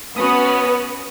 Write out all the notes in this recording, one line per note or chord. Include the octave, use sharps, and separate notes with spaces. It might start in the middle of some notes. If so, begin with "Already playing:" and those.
B3 C#4 F#4 D#6